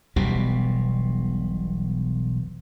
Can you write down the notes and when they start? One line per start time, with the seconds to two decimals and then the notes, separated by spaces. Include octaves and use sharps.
0.16 E1 B1 B2 G3